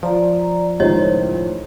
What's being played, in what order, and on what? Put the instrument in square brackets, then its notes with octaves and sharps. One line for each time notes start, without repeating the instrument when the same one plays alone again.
[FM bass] F3 [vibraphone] D5 A#5
[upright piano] C#2 A2 D#3 [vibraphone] C5 [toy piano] C#5 D#5